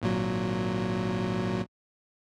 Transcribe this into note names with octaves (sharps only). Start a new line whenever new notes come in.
G#1 A#2 F#3